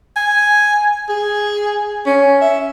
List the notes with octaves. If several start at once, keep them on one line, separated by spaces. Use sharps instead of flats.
G#5
G#4
C#4
E5